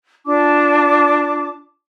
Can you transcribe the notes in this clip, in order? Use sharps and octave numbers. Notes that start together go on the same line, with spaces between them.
D4 F4 A5 D6